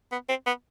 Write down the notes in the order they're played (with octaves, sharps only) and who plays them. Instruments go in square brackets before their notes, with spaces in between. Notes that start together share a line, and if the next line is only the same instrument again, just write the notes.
[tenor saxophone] B3
C4
B3